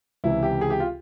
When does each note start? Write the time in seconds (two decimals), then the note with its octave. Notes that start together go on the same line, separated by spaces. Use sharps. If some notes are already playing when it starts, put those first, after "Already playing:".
0.24 C#2 C3 E3 E4
0.43 G4
0.61 G#4
0.70 G4
0.80 F4